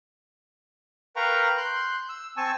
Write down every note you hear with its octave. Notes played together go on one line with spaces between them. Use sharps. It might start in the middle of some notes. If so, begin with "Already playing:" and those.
A#4 B4 F5 G5 A#5 C#6
C6 F#6 G6
E6
C4 G#5 A5 C#6 E6